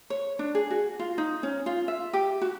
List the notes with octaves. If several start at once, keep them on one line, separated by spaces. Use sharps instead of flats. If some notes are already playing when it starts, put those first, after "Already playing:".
C#5
D4
G#4
F#4
F4
D#4
C#4
F4
E5
G4
F#4